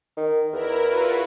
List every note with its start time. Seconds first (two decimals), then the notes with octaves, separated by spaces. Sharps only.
0.17 D#3
0.53 E2 E4 A#4
0.86 F4 F#4 B4